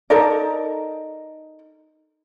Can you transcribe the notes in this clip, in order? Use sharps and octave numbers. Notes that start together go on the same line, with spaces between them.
D#4 A4 A#4 D5